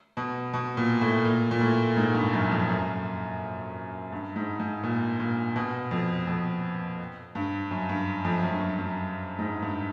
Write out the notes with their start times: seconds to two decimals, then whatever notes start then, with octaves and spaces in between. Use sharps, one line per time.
0.17 B2
0.53 B2
0.77 A#2
1.01 A2
1.25 A#2
1.51 A#2
1.61 A2
1.97 G#2
2.14 G2
2.33 F#2
2.51 F2
2.68 F#2
4.12 G2
4.36 G#2
4.59 G#2
4.84 A#2
5.20 A#2
5.56 B2
5.91 F2
6.27 F2
7.35 G2
7.71 F#2
7.89 G2
8.25 F2
8.43 F#2
8.51 G2
8.60 F#2
8.78 F#2
9.39 G#2
9.62 G2